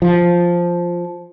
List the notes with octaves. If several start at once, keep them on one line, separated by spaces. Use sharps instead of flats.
F3